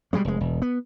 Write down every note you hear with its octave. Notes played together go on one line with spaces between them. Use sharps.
B2 G3 G#3 A#3
F1 G#3
E1
B3